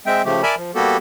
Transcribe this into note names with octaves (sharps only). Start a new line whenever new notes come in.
G#3 C4 E5 G5
C#3 F3 A3 G4
A#4 D5 E5 G#5 A5 B5
F3
G3 A#3 B3 F#4 G4 A4